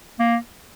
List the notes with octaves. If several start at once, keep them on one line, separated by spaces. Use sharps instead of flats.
A#3